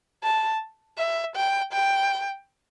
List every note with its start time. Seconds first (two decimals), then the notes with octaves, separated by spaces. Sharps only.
0.23 A5
0.98 E5
1.36 G5
1.73 G5